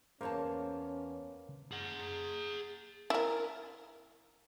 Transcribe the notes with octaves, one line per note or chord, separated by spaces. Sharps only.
E2 A#3 C#4 C5 C#5 A5
G#4 F#5
E4 A#4